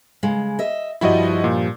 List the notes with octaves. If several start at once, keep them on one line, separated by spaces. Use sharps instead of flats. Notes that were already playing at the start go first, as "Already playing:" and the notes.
C#3 G#3
D#5 E5
G2 F3 G3 E4 F#4 D#5
A#2